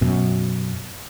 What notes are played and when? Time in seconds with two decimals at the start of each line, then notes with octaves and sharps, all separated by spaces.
0.01 F#2 B2